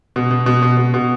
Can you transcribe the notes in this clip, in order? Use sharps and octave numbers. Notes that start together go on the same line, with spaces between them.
B2
B2
B2
B2
B2
B2